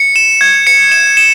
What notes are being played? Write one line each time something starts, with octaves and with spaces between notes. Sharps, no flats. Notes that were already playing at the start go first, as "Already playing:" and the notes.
Already playing: C#7
E7
G#6
C#7
E7
E7